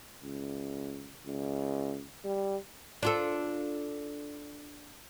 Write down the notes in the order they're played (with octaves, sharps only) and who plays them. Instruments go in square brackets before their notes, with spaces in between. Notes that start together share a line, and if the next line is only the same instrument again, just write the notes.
[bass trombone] C#2
C#2
G3
[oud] D4 F4 A4